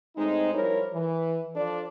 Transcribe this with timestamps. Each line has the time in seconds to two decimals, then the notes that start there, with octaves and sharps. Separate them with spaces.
0.17 A2 G#3 C4 D#4
0.54 F3 G3 E4 A#4 C5 C#5
0.93 E3
1.55 F3 D4 A4 D5